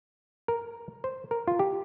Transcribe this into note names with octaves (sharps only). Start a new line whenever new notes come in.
A#4
C5
A#4
F4
G4